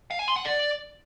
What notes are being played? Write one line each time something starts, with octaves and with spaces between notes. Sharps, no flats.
F5
G#5
C6
F#5
D5